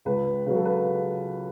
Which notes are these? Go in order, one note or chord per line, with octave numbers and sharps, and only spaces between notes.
C#2 B4
C#3 F#3 B4
A4
B4